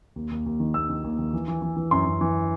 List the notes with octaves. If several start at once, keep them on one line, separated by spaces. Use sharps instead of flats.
D#2
D#2
D#2
D#3
D#2 E6
D#3
D#2
D#2
E3
E3
E3
E3
F#2 C6
F#2
E3